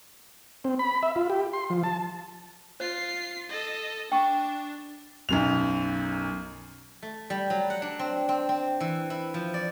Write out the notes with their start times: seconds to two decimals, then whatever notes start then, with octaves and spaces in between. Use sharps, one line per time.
0.64 C4
0.79 B5
1.03 E5
1.16 F4
1.30 G4
1.53 C6
1.70 F3
1.84 A5
2.80 F4 C5 C7
3.49 A4 D#5
4.12 D4 G5 C#6
5.29 B1 F#2 F7
7.03 A3
7.30 G3
7.50 F#3
7.70 F#5
7.82 D4
7.99 C4
8.29 C4
8.49 C4
8.80 E3
9.10 E4
9.34 F3
9.54 D5